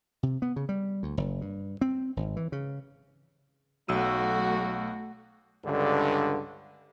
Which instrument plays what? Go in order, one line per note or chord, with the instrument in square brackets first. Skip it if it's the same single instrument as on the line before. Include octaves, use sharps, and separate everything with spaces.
[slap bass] C3
B3
C#3
G3
D2
F#1
G2
C4
G#1
E3
C#3
[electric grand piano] B1 E6 D#7 [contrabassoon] F#3 [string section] A3 F#4
[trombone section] C#2 G2 D3